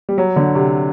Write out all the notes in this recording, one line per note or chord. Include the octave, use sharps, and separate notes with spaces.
G3
F#3
D3
C3